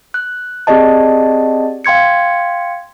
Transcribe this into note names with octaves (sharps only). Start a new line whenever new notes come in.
F#6
C4 G4 G#4 D5 D#5 A5
F5 G5 C6 G#6 C#7